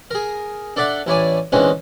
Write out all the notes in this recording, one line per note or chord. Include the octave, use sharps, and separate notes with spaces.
G#4 A#4
D4 A4 D5 E5 F#5
A1 E4 C#5 D5 G#5
D3 E3 G#3 C4 C#4 D#4